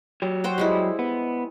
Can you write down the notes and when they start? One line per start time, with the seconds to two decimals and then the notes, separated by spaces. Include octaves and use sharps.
0.22 F#3 G4
0.44 F#4 C5 G5
0.58 G3 G#3 E4
0.99 B3